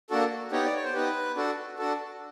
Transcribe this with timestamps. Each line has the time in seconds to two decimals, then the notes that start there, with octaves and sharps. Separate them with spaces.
0.10 A#3 D4 F#4 A4
0.51 B3 D#4 G4 C#5
0.65 D5
0.75 C#5
0.84 C5
0.94 B3 D#4 G4 B4
1.36 D4 F#4 A4
1.78 D4 F#4 A4